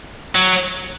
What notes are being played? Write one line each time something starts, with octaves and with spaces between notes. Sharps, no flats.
F#3